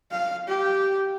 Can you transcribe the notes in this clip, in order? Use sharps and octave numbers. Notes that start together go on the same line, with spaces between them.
F5
G4